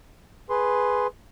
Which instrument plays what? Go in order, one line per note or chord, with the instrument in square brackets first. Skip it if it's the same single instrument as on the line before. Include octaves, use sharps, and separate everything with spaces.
[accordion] G#4 B4 C6